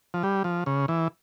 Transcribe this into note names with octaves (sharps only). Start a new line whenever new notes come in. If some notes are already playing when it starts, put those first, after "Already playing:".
F3
G3
F3
C#3
E3